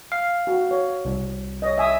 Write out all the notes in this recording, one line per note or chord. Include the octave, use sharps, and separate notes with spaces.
F5
F#4
C#5
C2
C#5 D#5
E5 G#5 D#6